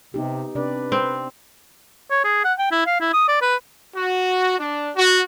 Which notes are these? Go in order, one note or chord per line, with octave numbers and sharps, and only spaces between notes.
C3 B3 D#4 G4
C3 D4 B4 D5
C4
C#5
G#4
F#5
G5
E4
F5
E4
D#6
D5
B4
F#4
D4
F#4